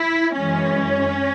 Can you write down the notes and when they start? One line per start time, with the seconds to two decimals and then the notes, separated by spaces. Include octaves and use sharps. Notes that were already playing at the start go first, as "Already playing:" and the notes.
Already playing: E4
0.36 F#2 E3 G#3 C#4